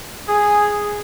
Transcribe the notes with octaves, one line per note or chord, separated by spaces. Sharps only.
G#4